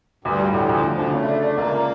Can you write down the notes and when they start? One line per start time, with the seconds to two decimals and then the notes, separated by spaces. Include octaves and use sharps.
0.24 D2 G2
0.39 G3
0.47 A2
0.54 D2
0.69 D2 F3
0.83 D2
0.91 F3
0.99 D3
1.13 C#3 A3
1.28 D4
1.43 D4
1.58 C#2 A#3
1.72 D4